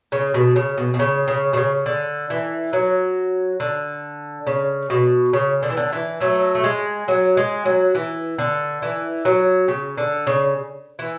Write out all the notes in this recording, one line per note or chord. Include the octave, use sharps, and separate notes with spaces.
C#3
B2
C#3
B2
B2
C#3
C#3
B2
C#3
D3
E3
F#3
D3
C#3
B2
C#3
D3
E3
D3
E3
F#3 A3
A3
G#3
F#3
G#3
F#3
E3
D3
E3
F#3
C#3
D3
C#3
E3